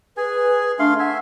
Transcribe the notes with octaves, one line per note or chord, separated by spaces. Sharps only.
G#4 B4 G#5
A3 D4 F5 C6
E5 F#5 G#5